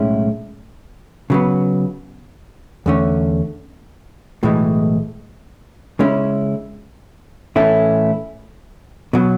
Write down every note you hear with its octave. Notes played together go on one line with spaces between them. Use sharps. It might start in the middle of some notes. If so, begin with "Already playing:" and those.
Already playing: B1 A2 G#3 C#4 E4
C#3 F#3 B3
E2 D3 A3 C#4
B1 A2 E3 G#3
C#3 G#3 C#4 E4
A2 E3 A3 C#4 E4
B2 F#3